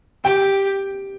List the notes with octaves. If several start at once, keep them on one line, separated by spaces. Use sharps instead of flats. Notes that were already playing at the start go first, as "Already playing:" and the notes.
G4 G5